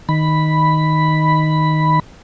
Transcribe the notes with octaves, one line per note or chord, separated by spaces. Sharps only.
D#3 B5